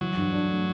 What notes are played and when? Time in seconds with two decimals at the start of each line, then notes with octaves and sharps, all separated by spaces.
0.01 E3 F#3
0.17 G2
0.32 D4
0.49 A3